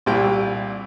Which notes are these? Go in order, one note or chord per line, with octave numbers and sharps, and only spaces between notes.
C2 A#2 G3 E4 G5